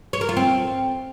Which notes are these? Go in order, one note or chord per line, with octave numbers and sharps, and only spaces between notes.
C#5
A#4
F4
C4